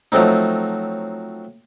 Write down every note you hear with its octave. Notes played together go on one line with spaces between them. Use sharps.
F3 F#3 A3 C4 D#4